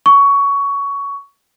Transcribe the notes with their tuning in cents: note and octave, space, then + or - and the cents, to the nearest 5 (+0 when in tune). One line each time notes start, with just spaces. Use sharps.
C#6 +15